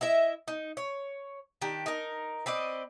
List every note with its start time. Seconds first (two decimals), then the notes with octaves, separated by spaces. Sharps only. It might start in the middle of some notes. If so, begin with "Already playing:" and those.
0.01 E4 D#5 E5
0.48 D#4
0.77 C#5
1.61 D#3 D4 G4
1.86 D#4 A#4
2.46 C4 B4 D5 D#5